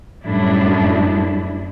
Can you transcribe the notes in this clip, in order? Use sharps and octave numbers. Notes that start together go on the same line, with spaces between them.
F#2 A2 G3 D4 E4